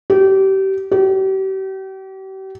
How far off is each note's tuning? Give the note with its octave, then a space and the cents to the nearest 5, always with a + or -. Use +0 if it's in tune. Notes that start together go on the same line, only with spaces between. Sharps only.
G4 -30
G4 -40